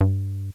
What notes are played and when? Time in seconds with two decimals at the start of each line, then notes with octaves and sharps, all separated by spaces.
0.01 G2